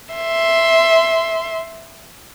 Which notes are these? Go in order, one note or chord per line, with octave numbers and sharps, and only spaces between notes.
E5 C6